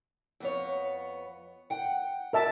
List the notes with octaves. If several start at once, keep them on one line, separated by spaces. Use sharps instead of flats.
F2 B3 C#5
F#5 G5
A#4 E5 A5